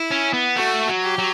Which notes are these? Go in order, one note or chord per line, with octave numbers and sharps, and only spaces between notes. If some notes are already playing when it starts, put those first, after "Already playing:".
Already playing: E4
C#4
B3
A3 F#4
F#3
G4
F#3